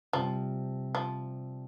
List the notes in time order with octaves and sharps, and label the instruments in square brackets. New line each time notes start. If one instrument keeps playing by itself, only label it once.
[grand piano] C3 G3 C4 [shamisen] F3
[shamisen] F3